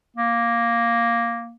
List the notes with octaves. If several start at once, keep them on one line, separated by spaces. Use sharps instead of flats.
A#3